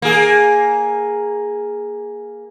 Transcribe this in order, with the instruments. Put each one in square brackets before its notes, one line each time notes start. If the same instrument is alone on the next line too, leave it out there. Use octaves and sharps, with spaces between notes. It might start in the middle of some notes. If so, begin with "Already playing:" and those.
[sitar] A#3 G#4